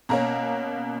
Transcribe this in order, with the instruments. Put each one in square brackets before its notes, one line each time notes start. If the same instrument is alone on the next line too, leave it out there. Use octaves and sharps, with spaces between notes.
[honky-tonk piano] B2 A#3 C#4 A#5